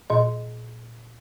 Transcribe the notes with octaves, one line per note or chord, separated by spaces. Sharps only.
A#2 D#5